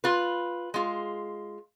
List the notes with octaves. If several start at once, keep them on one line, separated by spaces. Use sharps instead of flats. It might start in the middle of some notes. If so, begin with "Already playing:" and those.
F4 B4
G#3 F4